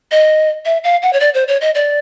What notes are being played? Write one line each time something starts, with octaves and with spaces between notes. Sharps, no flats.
D#5
E5
F5
F#5
C#5
D5
C5
C#5
D#5
D5